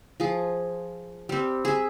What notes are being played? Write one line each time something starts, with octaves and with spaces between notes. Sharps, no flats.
F3 G#4
G3 C4
G#4 E5